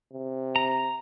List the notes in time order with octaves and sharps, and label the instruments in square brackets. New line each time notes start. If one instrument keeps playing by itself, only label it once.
[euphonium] C3
[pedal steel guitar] A#5